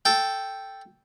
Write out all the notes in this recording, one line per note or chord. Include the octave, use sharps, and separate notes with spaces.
A4 G5